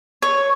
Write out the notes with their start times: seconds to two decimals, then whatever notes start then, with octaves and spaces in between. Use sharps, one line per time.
0.22 C#5